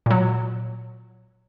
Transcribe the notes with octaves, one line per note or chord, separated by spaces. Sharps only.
A#2 F#3